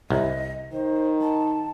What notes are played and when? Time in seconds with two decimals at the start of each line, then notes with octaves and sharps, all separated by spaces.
0.10 C2 D#5
0.73 D#3 C5
1.21 A5